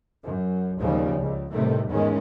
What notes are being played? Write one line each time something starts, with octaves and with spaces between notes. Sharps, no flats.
F#2
D#2 C#3 F3 G3
C#2
A2 C3 D#3 G3 A3
E2 G#2 D#3 G#3 C#4